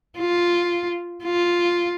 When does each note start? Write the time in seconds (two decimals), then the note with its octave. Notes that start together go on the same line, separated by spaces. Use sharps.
0.19 F4
1.24 F4